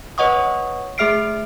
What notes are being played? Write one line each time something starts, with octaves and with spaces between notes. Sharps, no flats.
B4 C#5 D#5 F#5 C#6 D#6
A3 G#4 E5 F6 C7 D7